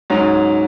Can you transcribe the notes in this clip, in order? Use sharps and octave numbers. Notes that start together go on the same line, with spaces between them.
G#2 F#3 C#4